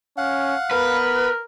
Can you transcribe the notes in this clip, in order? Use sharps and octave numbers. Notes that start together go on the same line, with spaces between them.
C#4 F5 F#5
B3 A#4 B4